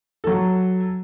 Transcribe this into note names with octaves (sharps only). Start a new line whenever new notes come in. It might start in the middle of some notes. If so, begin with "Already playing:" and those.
F#3 A4